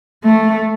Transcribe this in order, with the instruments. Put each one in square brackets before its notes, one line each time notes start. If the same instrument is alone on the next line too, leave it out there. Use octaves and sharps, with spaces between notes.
[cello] A3